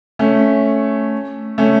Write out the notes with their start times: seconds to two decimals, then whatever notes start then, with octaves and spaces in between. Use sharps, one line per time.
0.19 A3 C#4
1.58 A3 C#4